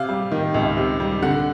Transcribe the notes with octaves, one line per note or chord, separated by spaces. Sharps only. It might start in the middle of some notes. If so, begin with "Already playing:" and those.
Already playing: C3 F5
G3
D#3
C#2
C3
G3
D3 F#5